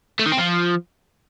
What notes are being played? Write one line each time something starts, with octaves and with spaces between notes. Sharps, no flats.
A3
D#3
C4
F3